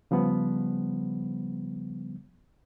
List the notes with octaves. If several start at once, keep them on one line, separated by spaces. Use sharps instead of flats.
C#3 F3 G3 B3